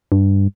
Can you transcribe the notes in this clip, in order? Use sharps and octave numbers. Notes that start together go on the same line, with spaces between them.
G2